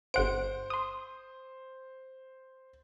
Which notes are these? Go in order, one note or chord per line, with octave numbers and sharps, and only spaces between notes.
G1 C5 F#5 D7
C6 D#6